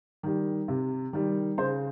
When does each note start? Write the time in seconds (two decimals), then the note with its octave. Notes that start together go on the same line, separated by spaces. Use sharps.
0.23 D#3 G3
0.68 C3
1.13 D#3 G3
1.58 C#3 C5